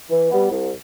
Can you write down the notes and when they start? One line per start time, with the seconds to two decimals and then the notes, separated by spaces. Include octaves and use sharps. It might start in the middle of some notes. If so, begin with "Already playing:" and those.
0.10 E3
0.31 G3 B3
0.52 C2